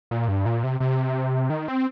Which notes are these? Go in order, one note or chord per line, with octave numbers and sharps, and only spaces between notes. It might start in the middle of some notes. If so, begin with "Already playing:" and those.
A#2
G2
A#2
C3
C3
D#3
C4